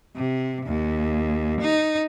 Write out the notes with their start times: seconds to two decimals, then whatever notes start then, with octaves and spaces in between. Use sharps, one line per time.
0.16 C3
0.66 D#2
1.61 D#4